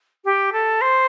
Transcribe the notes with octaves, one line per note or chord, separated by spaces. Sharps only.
G4
A4
C5